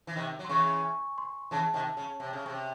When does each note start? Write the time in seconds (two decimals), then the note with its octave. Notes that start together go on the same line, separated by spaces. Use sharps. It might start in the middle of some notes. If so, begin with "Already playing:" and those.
0.07 E3
0.15 C3 D#3
0.39 F#3
0.45 C6
0.49 C#3 E3 C#6
0.84 G#5
1.18 C6
1.51 C#3 E3 A5
1.74 C3 D#3
1.97 C#3
2.20 C3
2.33 C#3
2.46 C3